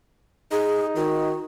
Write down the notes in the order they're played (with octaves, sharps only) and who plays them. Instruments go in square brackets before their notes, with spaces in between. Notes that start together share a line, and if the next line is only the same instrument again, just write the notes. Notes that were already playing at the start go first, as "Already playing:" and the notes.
[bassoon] D#4 [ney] G#4
[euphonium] D#3 [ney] F#4